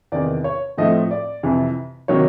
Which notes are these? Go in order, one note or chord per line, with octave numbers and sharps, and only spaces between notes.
E2 C3 D#3 D5
C#5
A2 F3 A3 C4 D#5
D5
F2 C3 E3
C3 D#3 F#3 C#5